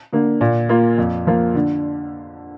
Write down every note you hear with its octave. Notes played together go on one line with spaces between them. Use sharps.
D3 A#3
A#2
A#3 F4
F2
F3 A#3 F4
D3